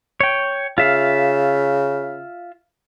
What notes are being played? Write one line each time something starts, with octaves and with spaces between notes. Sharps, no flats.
C#5 G5
C#3 F4 E5 F5